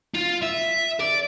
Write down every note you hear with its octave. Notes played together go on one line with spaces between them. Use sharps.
F4
E5
D5